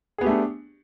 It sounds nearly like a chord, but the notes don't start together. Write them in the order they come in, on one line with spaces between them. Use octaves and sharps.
G#4 B3 G4 A3 D4